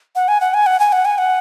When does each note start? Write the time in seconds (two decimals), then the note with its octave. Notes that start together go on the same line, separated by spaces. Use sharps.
0.16 F#5
0.28 G#5
0.41 F#5
0.54 G#5
0.66 F#5
0.80 G#5
0.92 F#5
1.05 G#5
1.18 F#5